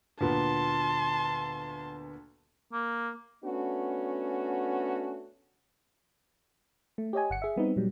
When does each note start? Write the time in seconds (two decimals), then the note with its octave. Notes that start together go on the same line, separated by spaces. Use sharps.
0.21 D2 A#2 B3 A5 C6
2.73 A#3
3.44 A3 B3 C#4 D4 F#4
6.98 A3
7.13 G4 C#5 D#5 G#5
7.30 G1 F#5 C#7
7.42 G#4 E5
7.56 G3 B3 C4 D#4
7.76 A#2 F#3 G3